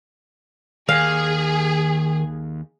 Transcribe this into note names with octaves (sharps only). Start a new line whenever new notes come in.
D#2 D#3 G#4 F5